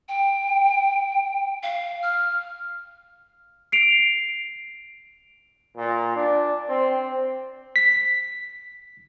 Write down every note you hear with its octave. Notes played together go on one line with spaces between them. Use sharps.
G5
F5
F6
C7 D7 F7
A#2
D4
C4
B6